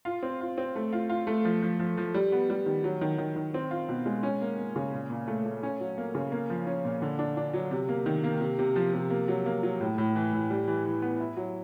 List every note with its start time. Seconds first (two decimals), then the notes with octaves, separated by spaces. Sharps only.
0.05 F4
0.23 C4
0.41 F4
0.58 C4
0.76 A3
0.93 F4
1.09 F4
1.27 A3
1.45 F3
1.62 F3
1.79 F3
1.97 F3
2.14 G3
2.32 B3
2.50 G3
2.66 D#3
2.84 F#3
3.01 D#3
3.18 D#3
3.36 D#3
3.54 C4
3.71 F4
3.89 B2
4.06 G#3
4.23 C#4
4.41 A#3
4.58 A#3
4.76 C#3
4.93 A#2
5.10 A#2
5.27 A3
5.45 A3
5.63 C#4
5.80 F#3
5.98 A#3
6.15 C#3
6.32 A#3
6.50 F3
6.67 C#4
6.84 A#2
7.02 D3
7.19 D4
7.37 D4
7.54 F#3
7.71 C3
7.89 A#3
8.06 D#3
8.24 A#3
8.41 C3
8.59 C3
8.76 F3
8.94 C3
9.10 A#3
9.28 F#3
9.46 A#3
9.63 F#3
9.81 A2
9.98 A2
10.15 E3
10.33 A2
10.50 G3
10.68 E3
10.85 E3
11.02 B3
11.20 E4
11.37 F#3